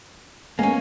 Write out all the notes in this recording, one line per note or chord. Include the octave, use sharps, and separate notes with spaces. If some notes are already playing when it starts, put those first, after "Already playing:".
G#3 A#3 B3 C#4 G#5